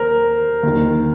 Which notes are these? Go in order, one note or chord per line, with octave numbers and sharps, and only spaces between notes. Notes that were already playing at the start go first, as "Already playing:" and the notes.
Already playing: D#2 A#4 C5
D#2 D#3